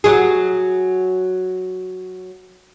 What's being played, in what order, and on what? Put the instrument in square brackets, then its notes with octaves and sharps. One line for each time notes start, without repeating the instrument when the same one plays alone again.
[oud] F#3 G#4